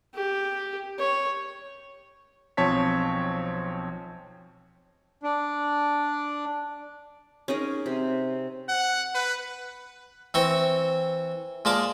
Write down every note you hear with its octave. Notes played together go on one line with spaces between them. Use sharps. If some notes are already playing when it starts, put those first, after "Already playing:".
G4
C#5
B1 F3 C4 C#5 A5 B6
D4
C#4 D#4 G#4 A#4
C3
F#5
B4
E3 C4 C5 A#5 C#6
A#2 G#3 A#4 D5 A5 D6